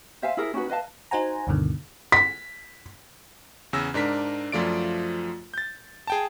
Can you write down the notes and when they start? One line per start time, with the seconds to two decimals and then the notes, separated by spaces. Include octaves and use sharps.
0.22 C5 E5 F5 G#5
0.37 E4 G#4 A#4 E5
0.54 C#4 D#4 F#4 B4
0.69 B4 D#5 F5 A5
1.11 D#4 F#4 C5 F#5 G#5 A#5
1.47 D2 G2 B2 D3 D#3
2.12 B6
3.73 E2 C#3 C#4 E6 A#6
3.94 G#2 D4 A#4 B6
4.52 F#2 F3 A3 F4 D5 D7
5.54 G6 A6
6.07 G#4 G5 A5